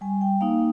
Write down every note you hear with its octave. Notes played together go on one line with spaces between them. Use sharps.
G3 G#5
G5
A#3 D#4 F5